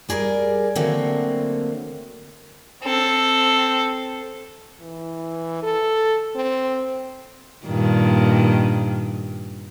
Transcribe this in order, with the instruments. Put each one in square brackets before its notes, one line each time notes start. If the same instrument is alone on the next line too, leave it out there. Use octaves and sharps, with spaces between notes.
[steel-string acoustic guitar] G3 G#4 A#4 C5 D5
D3 F#3 A3 A#3 C4
[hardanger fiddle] C4 A4
[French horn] E3
A4
C4
[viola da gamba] G2 A#2 D#3